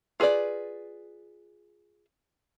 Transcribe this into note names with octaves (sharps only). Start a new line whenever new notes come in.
F4 G#4 B4 C5 D5